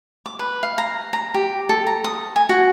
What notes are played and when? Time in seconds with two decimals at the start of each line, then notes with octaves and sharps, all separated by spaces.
0.26 D6
0.39 B4
0.63 F5
0.78 A#5
1.13 A#5
1.34 G4
1.69 A4
1.87 A#5
2.04 D#6
2.36 G#5
2.49 F#4